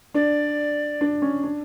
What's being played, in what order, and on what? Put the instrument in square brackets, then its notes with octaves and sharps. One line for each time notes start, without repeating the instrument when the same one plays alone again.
[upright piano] D4 [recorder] D5
[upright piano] D4
C#4
D4